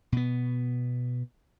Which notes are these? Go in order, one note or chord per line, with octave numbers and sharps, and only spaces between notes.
B2 B3